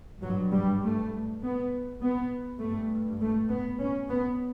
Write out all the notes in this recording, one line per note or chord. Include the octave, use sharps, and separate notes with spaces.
G2 F#3
G3
A3
B3
B3
G2 A3
A3
B3
C#4
B3